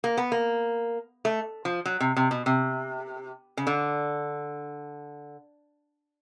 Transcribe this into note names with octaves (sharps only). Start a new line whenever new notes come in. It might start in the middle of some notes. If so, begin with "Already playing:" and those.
A#3
B3
A#3
A3
F3
F#3
C3
C3
B2
C3
C#3
D3